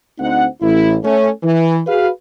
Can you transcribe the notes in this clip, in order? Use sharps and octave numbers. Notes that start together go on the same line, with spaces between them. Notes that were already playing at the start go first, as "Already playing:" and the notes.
D2 C4 D#4 C5 F#5
A1 E4
A3 C#4
E3
F#4 G#4 B4 F5